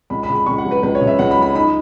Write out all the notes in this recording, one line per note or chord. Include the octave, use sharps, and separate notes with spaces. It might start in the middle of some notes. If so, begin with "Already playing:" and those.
C#2 B5
B5
C#3
B5
C#2 C#6
F#5
F#3
B4
C#2 B4
C#5
C#3
E5
C#2 F#5
B5
F#3
B5
D#4 B5